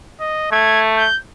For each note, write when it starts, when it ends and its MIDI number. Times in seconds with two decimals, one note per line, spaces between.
0.20 0.50 75
0.52 1.07 57
0.52 0.81 92
0.96 1.18 91